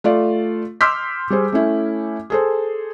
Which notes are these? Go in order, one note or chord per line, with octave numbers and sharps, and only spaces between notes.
A3 F4 D5
C6 D6 E6 F6 G6 B6
G3 G#4 C5
A3 C#4 E4
G#4 A4 C5